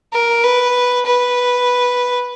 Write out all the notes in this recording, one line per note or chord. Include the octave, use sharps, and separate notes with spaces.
A#4
B4
B4